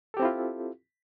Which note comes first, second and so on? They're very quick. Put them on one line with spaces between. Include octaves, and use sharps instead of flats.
A4 G4 C4 E4 F4